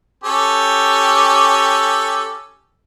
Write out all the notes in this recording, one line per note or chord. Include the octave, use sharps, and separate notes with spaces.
C#4 G4 A4